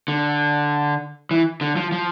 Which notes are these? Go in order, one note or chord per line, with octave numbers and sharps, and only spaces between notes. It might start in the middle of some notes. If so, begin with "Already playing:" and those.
D3
E3
D3
F3
F3